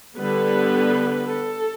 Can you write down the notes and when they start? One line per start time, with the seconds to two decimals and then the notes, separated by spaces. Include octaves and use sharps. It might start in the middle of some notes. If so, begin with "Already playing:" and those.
0.18 D3 G3 B3 B4
1.26 A4